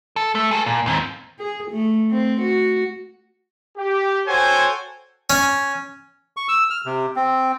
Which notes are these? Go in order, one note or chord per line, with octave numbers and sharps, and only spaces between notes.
A4
A3
G#4 A4
A#2
D#2 C4
G#4
A3
C4
F#4
G4
F#4 A4 C5 C#5 G5 G#5
C#4
C#6
E6
F6
C3
C4